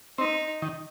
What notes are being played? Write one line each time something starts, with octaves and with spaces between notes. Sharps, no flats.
C4 D#4
D#3